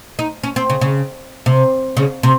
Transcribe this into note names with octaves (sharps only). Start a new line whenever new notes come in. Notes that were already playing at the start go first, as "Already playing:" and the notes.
D#4
C#4
C4
C#3
C#3
C3
C#3
C3